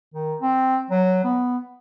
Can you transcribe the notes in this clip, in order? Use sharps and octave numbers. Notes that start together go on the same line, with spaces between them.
D#3
C4
F#3
B3